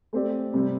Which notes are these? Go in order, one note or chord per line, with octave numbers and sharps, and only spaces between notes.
A3 C4 G4 D5
C3 G3 C4